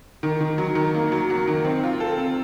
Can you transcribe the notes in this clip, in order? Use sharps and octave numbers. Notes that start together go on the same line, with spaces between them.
D#3
D#3
F#3
D#3
A#3
F#3
F#3
D#3
C4
F4
A4
C4